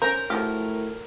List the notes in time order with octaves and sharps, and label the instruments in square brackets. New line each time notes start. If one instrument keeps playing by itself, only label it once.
[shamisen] C#4 C5 [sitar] A#4 [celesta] G6
[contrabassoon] A2 [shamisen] F3 F#3 G4 [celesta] F6